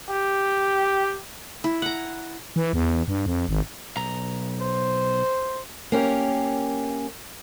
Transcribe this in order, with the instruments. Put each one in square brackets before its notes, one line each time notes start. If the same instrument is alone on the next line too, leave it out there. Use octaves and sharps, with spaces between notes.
[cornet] G4
[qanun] E4
F#5 A#5
[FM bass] E3
E2
G2
F2
G#1
[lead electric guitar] B1 A#5
[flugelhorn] C5
[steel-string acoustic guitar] A#3 C#4 G4